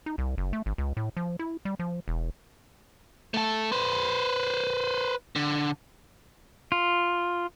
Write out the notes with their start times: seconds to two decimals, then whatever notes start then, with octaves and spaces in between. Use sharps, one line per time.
0.06 D#4
0.18 C2
0.38 F#1
0.53 A3
0.66 G#1
0.78 C#2
0.97 A2
1.17 F3
1.39 E4
1.65 G3
1.79 F3
2.08 E1
3.34 A3 A4
3.72 B4 C5
5.36 D3
6.72 F4